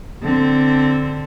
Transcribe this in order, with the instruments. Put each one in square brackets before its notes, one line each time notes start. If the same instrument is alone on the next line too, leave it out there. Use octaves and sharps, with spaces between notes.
[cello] D3 C4